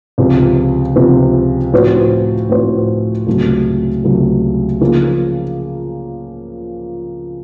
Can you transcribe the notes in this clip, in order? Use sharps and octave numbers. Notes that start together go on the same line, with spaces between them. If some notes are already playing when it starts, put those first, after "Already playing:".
C#2 C3 F3 C4
C#2 C3 F3 C4
A2 F3 C4 F#4 C5
A2 F3 C4 F#4 C5
C#2 C3 F#3 A3
C#2 C3 F#3 A3
C#3 F3 A#3